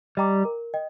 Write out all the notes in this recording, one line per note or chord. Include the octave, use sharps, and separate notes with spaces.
G3 D#5 G5 A#5 D6
A#4
D#5 G5